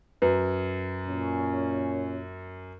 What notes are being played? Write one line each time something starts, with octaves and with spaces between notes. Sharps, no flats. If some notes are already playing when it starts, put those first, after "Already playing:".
F#2 B4
A#2 C#4